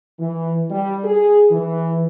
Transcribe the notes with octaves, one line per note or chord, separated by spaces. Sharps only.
E3
G3
G#4
E3